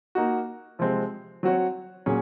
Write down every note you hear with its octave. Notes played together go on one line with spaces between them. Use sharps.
A#3 D#4 F#4
C3 F3 G#3 C4
F#3 C4 F#4 C#5
A#2 F#3 C#4 G#4